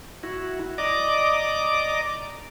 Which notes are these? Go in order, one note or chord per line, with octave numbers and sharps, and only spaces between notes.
E4 F#4
D5 D#5 A#5 D6